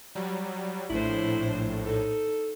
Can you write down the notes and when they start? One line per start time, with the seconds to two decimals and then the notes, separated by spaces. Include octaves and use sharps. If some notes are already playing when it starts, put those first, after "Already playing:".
0.15 F#3 G3
0.90 A#1 A2 D4 E4 C5
1.86 D#4 A4